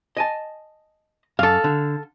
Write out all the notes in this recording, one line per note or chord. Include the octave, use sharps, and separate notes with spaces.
D#5 G#5 A5
F#2 A4 F5
D3